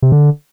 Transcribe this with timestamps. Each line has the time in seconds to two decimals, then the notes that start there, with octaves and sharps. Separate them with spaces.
0.02 C3
0.12 D3